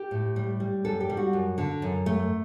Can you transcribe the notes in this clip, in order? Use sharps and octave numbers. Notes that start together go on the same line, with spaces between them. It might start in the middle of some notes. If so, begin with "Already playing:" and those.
Already playing: G4
A2
G3
G3
F#2 A4
G4
G3
F#4
F#2
D3
F#2
A3